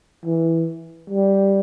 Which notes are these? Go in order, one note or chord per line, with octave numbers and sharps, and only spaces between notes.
E3
G3